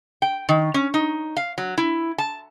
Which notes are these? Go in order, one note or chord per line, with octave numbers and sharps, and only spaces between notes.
G5
D#3
C#4
D#4
F5
F#3
E4
A5